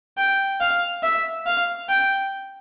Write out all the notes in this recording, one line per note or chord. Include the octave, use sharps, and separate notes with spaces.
G5
F5
E5
F5
G5